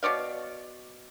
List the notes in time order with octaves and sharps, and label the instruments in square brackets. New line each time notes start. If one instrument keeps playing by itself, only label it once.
[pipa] B2 C#5 D5 F5